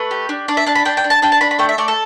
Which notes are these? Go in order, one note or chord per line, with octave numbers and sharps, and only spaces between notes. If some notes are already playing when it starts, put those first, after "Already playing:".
Already playing: A3 B4
G4
D4
D4 D5
E5
D4 A5
B5
D4 G5
G5
D4
A5
D4 G5
A5
D4 B5
B5
A3 G5
E5
A3 D5
A4